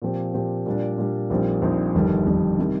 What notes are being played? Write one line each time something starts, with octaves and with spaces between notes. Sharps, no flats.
A#2 F3 C4 G4
A#2 F3 C4 G4
A#2 G3 D4
A#2 G3 D4
A#1 A#2 G3 C4 D#4
A#1 A#2 G3 C4 D#4
G1 F2 D#3 G3
G1 F2 D#3 G3
C3 D#3 G3